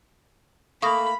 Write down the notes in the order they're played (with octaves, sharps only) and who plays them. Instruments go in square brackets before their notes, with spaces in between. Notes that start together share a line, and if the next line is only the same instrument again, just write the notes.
[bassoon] A3 [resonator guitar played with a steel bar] A#3 F5 [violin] B5 [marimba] C#6 D#6 A#6